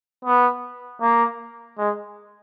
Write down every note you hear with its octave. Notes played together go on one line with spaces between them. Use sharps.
B3
A#3
G#3